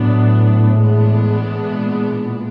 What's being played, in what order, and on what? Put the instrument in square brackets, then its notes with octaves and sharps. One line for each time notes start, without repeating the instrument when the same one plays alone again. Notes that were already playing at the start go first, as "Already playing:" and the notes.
Already playing: [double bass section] A2 [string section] F#3 B3 D4
[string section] E3 G#3 B3 D4
[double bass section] A#2